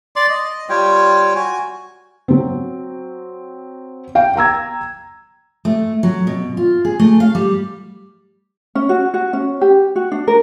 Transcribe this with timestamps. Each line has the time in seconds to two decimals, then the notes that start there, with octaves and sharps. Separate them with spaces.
0.16 D5 C6 D6
0.29 D#5
0.69 G3 F4 C#5 G5
1.36 F#4 G#5
2.28 F#3 C4
4.15 F5 G5
4.36 G5 A#5 E6 G#6
5.65 A3
6.03 F#3
6.27 B2
6.57 F4
6.85 G#4
6.99 A3
7.20 F5
7.35 G3
8.75 C#4
8.89 F#4
9.14 F#4
9.33 C#4
9.61 G4
9.96 F#4
10.12 D4
10.28 A#4